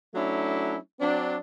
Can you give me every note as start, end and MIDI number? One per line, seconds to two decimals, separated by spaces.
0.14 0.76 54
0.14 0.76 57
0.14 0.76 61
0.14 0.76 62
0.14 0.76 64
1.00 1.37 54
1.00 1.37 60
1.00 1.37 62